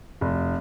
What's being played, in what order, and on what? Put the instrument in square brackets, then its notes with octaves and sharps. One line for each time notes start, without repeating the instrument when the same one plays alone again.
[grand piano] F1